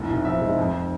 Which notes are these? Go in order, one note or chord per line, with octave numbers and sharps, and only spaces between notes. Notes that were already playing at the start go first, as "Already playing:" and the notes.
Already playing: F1 A2
B1
F3 E5
G#3
F2